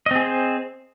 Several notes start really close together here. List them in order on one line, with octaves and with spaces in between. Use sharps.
D#5 C4 G#4 C5